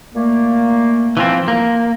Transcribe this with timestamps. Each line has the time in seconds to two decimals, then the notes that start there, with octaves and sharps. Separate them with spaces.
0.15 A#2 A3 A#3
1.17 E3 F3 C4
1.48 A#3